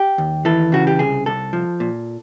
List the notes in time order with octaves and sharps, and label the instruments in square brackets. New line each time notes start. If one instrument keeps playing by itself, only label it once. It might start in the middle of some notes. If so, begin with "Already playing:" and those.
Already playing: [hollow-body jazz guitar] G4
D#2
E3 A4
C#3 F#4
G4
C2 G#4
C2 A4
F3
A#2